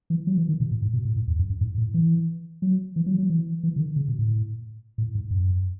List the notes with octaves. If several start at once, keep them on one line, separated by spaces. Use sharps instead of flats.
E3
F#3
E3
D#3
B2
A2
G#2
B2
A2
G#2
E2
F#2
F#2
G#2
A2
E3
F#3
E3
F#3
F#3
E3
E3
C#3
D#3
C#3
B2
A2
A2
G#2
F#2